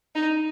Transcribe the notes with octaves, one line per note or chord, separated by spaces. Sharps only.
D#4